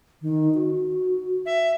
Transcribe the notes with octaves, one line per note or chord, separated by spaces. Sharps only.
D#3
F#4
E5